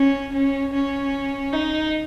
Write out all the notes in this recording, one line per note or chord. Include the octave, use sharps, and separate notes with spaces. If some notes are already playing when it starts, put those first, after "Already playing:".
Already playing: C#4
C#4
C#4
D#4